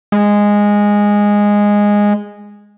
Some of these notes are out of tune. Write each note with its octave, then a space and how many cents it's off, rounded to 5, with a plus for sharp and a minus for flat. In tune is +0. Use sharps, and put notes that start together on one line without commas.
G#3 -10